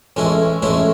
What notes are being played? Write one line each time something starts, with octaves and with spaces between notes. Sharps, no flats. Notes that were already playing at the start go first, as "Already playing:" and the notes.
A1 A2 G#3 C#4 E4
A1 A2 G#3 C#4 E4